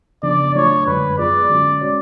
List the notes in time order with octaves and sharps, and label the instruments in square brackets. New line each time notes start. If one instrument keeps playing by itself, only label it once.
[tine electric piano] C#3 F3 B3 D4 [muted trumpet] D5
[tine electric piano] F#3 A3 D4 F4 [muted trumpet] C#5
[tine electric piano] F#2 D3 G#3 [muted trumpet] B4
[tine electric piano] F#3 B3 F4 G#4 [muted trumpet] D5
[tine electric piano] D3 G#3 C#4 F#4
G#3 C#4 F#4 C#5